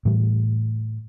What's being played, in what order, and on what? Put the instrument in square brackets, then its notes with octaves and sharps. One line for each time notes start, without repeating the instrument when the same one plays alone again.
[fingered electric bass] A2 E3 G3